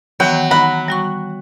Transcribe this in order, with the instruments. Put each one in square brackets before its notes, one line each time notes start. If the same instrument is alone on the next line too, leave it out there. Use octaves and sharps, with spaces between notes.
[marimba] D#3 E3 B3 [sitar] F#3 [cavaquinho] G5
[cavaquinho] F#5 A#5 [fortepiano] B5
[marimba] G3 F#4 C#6